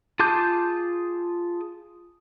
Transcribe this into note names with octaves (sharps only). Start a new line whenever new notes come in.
F4 G#4 A5 D6 G6